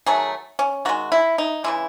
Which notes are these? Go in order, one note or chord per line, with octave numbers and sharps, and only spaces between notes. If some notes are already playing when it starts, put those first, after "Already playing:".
D#3 F#3 A3 G#4
C#4
D#3 G#3 F#4
E4
D#4
C#3 E3 G#3 E4